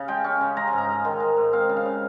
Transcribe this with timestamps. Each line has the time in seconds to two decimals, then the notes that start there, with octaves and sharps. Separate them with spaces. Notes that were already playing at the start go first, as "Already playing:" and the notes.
Already playing: C#3 F5
0.08 G#3 G5
0.24 C#4
0.41 C#3
0.57 G#3 A#5
0.68 G#5
0.73 G#2
0.78 A#5
0.89 G#2
1.05 D#3 C6
1.20 G#3
1.37 G#2
1.53 C4 F5
1.69 C#3
1.77 F5
1.85 C#3